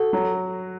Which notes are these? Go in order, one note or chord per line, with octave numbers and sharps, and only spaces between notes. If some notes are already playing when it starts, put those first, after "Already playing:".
Already playing: F#4 A4
F#3